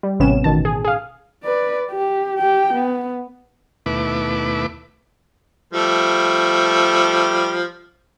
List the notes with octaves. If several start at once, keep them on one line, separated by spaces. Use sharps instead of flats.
G3
A1 C3 B3 C#4 E7
A1 B2 D#3 A5
G#4
G#4 F5
B4 D5
G4
G4 G5
B3
D#2 B2 A3 E4 B4 D6
F3 G3 A3